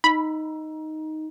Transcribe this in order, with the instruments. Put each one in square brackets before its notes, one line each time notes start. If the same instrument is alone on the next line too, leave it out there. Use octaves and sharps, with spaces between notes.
[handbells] D#4 [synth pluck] B5